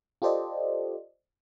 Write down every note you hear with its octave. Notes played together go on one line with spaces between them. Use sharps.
F4 G4 A4 C5 D5 D#5